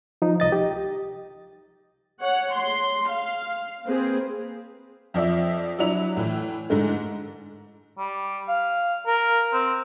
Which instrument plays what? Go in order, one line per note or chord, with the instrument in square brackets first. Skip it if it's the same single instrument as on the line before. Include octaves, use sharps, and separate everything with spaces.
[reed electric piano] F3 D#4
C2 D#5 A6
G4
[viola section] C#5 F#5
C6
F5
A#3 C4 G#4 B4 C5
[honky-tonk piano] F2 F3 D5 E5
F#3 D4 E4 F7
A2 E3
G#2 D3 G#3 A3
[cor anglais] G3
F5
A#4
C4